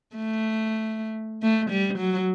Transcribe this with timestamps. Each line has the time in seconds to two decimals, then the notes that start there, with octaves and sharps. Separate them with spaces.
0.16 A3
1.42 A3
1.70 G3
1.98 F#3